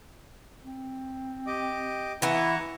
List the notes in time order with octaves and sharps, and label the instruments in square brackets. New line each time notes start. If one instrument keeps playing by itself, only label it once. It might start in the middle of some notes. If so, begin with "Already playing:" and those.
[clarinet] C4
[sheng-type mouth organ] G4 D#5 D6
[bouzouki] E3 B3 [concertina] E4 [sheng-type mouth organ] A#5 C#6